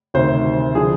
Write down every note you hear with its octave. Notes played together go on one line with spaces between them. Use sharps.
D2 C3 D#3 C5
D3 F3 G#4